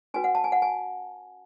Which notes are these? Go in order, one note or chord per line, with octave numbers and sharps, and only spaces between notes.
C#4 F#4 B4 G#5
F#5
A5
G#5
F#5
G#5